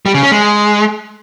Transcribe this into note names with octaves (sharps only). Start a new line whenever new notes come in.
G3
C#3
C#4
G#3